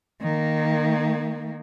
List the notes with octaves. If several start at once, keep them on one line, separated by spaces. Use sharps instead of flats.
D#3 A#3